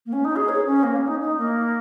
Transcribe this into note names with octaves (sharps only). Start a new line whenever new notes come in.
A#3
C#4
D#4
G#4
C#5
C#4
A#3
C#4
D#4
D#4
A#3